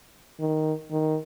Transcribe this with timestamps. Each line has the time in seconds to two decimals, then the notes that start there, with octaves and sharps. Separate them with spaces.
0.40 D#3
0.91 D#3